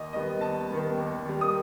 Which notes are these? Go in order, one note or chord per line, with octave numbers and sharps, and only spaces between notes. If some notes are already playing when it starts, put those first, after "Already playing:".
Already playing: D#2 D#5
D#3 G3 B3 D#5
D#2 A5
D#3 G3 B3
D#2
D#3 G3
D#6